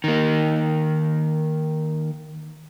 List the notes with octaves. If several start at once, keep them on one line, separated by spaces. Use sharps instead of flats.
D#3 A#3